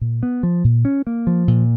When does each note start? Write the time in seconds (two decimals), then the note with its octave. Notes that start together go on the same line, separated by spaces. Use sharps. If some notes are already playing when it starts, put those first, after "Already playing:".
0.01 A#2
0.23 B3
0.43 F3
0.64 A#2
0.85 C#4
1.07 A#3
1.27 F3
1.48 A#2